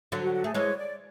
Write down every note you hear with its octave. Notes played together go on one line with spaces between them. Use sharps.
D3 F#3
F#4
F#4
A3 G#4
E3 G#3 C#5
D5